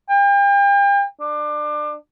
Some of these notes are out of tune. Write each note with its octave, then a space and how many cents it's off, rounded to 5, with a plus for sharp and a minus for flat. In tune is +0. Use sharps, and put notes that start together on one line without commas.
G5 +40
D4 +25